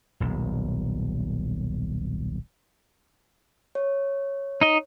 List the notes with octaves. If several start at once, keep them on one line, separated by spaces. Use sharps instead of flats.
D#1 B1
C#5
D#4 D#5